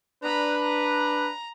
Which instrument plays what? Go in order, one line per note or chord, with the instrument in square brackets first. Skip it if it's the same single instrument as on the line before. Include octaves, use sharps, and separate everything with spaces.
[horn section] D4 B4 [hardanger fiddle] A#5 B5
[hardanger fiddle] A#5